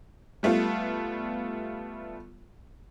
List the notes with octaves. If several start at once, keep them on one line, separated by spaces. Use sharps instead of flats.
G3 A3 B3 F4